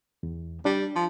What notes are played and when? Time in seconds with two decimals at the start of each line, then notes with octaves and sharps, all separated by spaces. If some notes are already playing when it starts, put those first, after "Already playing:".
0.23 E2
0.65 G3 D4
0.96 F3